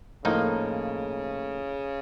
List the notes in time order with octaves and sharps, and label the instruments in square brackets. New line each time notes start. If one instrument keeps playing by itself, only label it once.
[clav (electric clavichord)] A2 F3 A#3 D#4 [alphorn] C#3